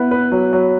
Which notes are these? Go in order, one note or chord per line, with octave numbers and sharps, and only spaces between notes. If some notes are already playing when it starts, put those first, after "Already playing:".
Already playing: B3 E4 B4
B4
F#3
F#3